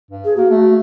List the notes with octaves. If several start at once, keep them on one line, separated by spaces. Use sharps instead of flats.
G2
G#4
A#3 F#4
A3